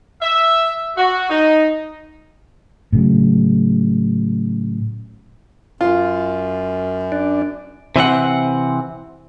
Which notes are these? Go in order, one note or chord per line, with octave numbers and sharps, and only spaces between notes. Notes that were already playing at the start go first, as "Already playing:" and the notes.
E5
F#4
D#4
A2 C#3 F#3
F#2 F4
D4
C3 E3 C4 F#5